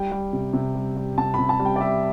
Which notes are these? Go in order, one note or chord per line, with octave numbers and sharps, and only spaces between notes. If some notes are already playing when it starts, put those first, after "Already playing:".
Already playing: G3 G5
G3
C3
C3
G3
G3
C3 A5
C3 B5
A5
G3
G5
D5
G3 E5